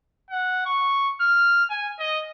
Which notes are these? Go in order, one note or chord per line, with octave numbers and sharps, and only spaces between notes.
F#5
C#6
F6
G#5
D#5